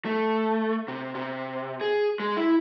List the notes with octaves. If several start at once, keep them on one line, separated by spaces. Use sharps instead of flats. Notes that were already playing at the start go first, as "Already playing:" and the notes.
A3
C3
C3
G#4
G#3
E4